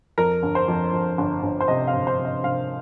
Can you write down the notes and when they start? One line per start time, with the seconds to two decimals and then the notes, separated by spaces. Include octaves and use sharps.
0.18 F2 A#4
0.43 G1
0.55 C5
0.68 F2
0.93 F2
1.18 G1
1.43 G1
1.60 C5
1.68 C3 D#5
1.87 F5
1.94 G1
2.07 C5
2.19 C3
2.25 D#5
2.44 C3 F5